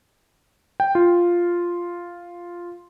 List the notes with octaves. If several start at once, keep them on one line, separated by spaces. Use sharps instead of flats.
G5
F4